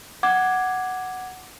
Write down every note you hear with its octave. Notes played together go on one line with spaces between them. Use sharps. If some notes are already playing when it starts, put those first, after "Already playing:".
F#5 D6 G#6